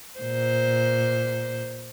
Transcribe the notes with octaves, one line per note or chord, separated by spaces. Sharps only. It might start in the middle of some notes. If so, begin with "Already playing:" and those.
A#2 C5